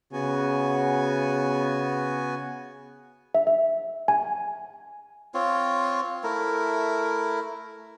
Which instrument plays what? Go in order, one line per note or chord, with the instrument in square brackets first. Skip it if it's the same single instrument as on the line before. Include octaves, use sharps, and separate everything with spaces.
[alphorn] C#3 [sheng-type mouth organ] B3 F#4 G#5
[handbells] E5
E5
G#5
[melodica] C4 F4 C#5
A3 E4 A#4